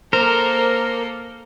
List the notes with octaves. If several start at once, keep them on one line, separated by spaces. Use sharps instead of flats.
A#3 A4 A#4 C5